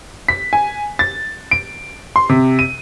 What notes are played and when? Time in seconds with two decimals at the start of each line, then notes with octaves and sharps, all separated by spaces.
0.28 B6
0.53 G#5
0.99 A6
1.51 D7
2.16 C6
2.29 C3
2.59 D#7